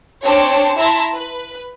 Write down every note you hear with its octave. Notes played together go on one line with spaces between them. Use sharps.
C4 D4 C5 C#5 A5
E4 E5 A5 A#5 C6
B4